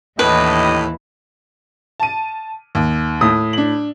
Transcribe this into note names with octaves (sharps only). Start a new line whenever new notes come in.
D#2 A2 E3 D4 G4 B4 D#5
A5 D#7
D#2
A2 D#6
D4 F#7